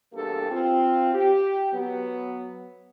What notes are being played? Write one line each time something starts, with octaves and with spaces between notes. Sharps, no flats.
E2 G2 A#3 G4 A4
C4 F4
G4
F#3 B3